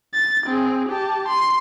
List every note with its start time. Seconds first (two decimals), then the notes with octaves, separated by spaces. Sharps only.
0.14 A6
0.46 C4 G#4
0.89 G4 A5
1.28 C6